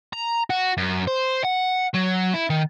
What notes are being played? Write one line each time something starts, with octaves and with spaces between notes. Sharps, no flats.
A#5
F#4
F#2
C5
F#5
F#3
E4
D#3